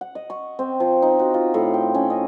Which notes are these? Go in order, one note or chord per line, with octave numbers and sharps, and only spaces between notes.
F#5
D#5
C#6
C4
F3
D#4
F#4
F4
A2
G5
C#4
D#5